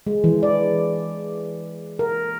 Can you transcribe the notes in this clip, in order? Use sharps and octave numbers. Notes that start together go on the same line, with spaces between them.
G#3
E3
D5
A#4